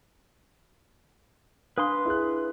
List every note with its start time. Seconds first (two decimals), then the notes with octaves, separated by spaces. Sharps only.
1.78 D4 B4 F5 C6 D#6
2.05 E4 G#4 F#6